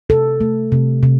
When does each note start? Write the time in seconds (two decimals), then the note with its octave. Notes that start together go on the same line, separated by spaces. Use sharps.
0.09 C3 A4
0.41 A3
0.72 C3
1.03 C3